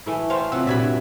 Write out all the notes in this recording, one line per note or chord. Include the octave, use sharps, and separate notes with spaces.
E3 A3 E4
A2 C5 C#5 F5 G5
C3 F#3 A3 F4 E6
G2 A#2 F#4 D5 E5 G#5 B5